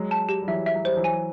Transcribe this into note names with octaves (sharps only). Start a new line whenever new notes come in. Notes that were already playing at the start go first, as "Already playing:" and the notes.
Already playing: F#3 G#3
A5
G4
G3
E3 F#3 E5
E5
F#3
G3 C5
E3 F#3
G#5